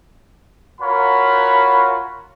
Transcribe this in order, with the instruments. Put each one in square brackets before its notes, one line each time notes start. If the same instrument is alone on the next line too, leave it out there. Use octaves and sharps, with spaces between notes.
[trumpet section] F4 F#4 A#4 C#5 B5